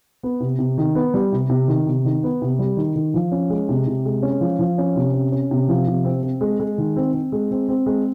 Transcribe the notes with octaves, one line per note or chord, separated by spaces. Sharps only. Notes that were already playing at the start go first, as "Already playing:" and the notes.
B3
C3
C3
D#3
B3
G3
C3
C3
D#3
C3
D#3
B3
C3
G3
D#3
D#3
F3
C#4
G#3
C3
C3
G#3
C#4
F3
F3
C#4
C3
C#4
C#4
C3
F3
C3
C4
C4
G#3
G#3
D#3
C4
C4
G#3
C4
C4
G#3